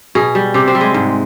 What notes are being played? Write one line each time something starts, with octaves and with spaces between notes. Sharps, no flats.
B2 G#4
G3
C3 G4
C4
G3
G#3
G#2